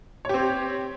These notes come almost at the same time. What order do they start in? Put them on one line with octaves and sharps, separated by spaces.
C#5 G4 C4